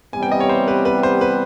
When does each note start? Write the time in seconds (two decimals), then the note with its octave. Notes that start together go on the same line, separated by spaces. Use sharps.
0.13 C3 E3 G3 B3 G#5
0.23 G5
0.32 D#5
0.40 C#5
0.49 C5
0.68 B4
0.85 B4
1.03 C5
1.21 B4